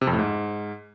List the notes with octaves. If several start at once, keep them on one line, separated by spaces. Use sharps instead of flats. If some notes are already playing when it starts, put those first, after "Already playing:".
C3
F2
A2
G#2